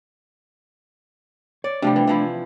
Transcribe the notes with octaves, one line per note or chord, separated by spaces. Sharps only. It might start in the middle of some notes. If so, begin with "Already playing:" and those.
C#5 D5
C3 F3 G3 A3 D4
E3
E3 F3 E4